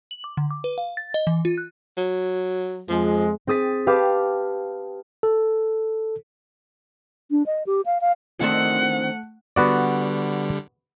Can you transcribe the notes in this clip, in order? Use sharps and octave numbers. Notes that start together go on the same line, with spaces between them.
F#7
D6
D3
D6
B4
F5
A6
D#5
E3
F4
F#6
F#3
F2 F3 G#3
C4 G#4 D#6 A6 B6
G4 B4 F5 A5 D6
A4
D4
D#5
G4
F5
F5
D#3 A3 C4 D4 F#5
D3 G3 B3 F#4 D5